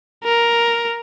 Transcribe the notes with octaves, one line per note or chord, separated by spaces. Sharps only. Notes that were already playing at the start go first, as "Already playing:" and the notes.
A#4